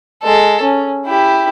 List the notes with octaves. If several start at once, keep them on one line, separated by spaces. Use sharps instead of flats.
G#3 A4
C#4
E4 G4